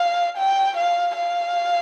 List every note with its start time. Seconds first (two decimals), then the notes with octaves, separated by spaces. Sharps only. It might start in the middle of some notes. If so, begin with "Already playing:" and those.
Already playing: F5
0.37 G5
0.77 F5
1.16 F5